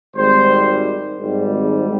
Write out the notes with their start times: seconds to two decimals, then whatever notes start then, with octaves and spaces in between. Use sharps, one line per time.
0.16 G#1 G#2 G3 C5
1.19 G#1 G#2 G3